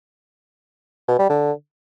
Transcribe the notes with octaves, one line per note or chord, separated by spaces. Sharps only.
B2
G3
D3